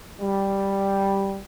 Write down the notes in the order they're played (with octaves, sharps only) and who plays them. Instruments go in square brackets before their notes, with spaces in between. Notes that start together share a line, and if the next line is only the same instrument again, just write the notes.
[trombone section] G3